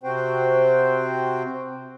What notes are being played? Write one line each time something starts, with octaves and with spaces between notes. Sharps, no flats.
C3 C4 F#4 C5 G5